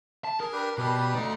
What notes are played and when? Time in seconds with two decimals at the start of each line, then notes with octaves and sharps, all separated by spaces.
0.24 A5
0.40 G#4 A#4
0.53 D4 G4 B4
0.78 B2 G3 G4 B4
1.14 A3 D#4 D5